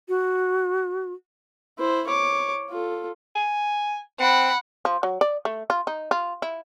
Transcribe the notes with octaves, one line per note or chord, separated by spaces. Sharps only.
F#4
E4 C5
C#5 D6
F4 A4
G#5
C4 F#5 B5
F3
F#3
D5
A3
F4
D#4
F4
E4